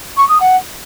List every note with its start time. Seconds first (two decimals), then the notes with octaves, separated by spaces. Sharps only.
0.17 C#6
0.28 D#6
0.40 F#5